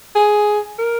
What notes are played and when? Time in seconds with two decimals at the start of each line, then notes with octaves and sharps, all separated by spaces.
0.16 G#4
0.79 A#4